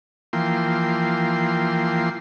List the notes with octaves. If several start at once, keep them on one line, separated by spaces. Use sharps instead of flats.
E3 F3 A#3 G5 C6